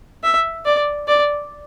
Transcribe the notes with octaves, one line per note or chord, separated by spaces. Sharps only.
E5
D5
D5